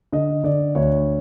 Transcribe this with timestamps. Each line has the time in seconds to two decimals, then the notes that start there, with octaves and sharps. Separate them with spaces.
0.12 D3 D#5
0.44 D3 D5
0.75 D2 C#5